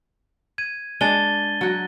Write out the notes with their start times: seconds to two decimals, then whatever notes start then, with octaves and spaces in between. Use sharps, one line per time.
0.58 G#6 D#7
1.01 G#3 D4 A6 D#7 G7
1.61 F#3 F#4